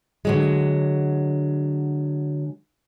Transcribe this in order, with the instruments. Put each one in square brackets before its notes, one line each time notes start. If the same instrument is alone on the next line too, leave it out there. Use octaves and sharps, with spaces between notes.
[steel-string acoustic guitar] D3 F#3 G#3